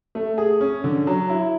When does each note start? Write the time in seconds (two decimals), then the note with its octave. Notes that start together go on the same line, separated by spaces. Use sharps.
0.15 A3
0.38 G#4
0.61 C#4
0.84 D3
1.07 F#3
1.30 E4